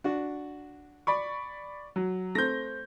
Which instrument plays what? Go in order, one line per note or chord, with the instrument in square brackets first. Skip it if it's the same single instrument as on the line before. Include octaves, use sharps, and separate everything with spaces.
[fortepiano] D4 F#4
[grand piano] D5 B5 C#6
F#3
[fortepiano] A3 C4 [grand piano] G6 A#6